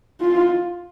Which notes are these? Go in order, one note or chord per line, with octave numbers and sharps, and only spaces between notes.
F4